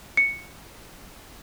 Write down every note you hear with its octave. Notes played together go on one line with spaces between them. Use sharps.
C#7